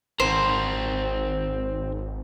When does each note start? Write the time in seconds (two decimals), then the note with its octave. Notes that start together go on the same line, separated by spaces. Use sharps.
0.20 G#1 C4 A#4 C5